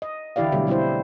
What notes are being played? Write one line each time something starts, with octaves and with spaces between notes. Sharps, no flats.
D#5
D3 E3 E4 G4 D5 F5
B2 D3 E3 F#3 G3 A3
B2 G3 C4 E4 C5